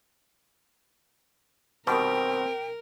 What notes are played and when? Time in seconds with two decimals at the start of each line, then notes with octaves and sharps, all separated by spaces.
1.87 B2 D#3 G3 C4 A#4 G5